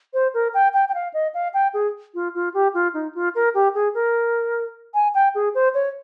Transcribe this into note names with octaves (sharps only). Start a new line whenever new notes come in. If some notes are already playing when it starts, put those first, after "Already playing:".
C5
A#4
G5
G5
G5
F5
D#5
F5
G5
G#4
F4
F4
G4
F4
D#4
F4
A#4
G4
G#4
A#4
G#5
G5
G#4
C5
C#5